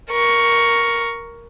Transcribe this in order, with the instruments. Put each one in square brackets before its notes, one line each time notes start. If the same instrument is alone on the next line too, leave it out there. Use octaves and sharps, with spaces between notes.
[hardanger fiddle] A#4 C#6